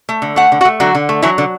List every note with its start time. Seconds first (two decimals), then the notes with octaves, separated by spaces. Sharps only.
0.09 A3
0.22 D3
0.36 A3 F#5
0.52 D3
0.61 F#4 F#5
0.65 A3
0.80 D3 F#3 F#4
0.95 D3
1.09 A3
1.22 E3 F#3 E4
1.38 D3